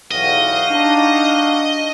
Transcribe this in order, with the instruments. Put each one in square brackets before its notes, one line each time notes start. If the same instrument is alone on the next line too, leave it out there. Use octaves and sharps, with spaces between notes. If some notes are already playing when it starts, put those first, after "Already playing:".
[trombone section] B1 E2 [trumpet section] F#4 G4 F5 [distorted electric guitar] D#5
[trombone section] D4 D#4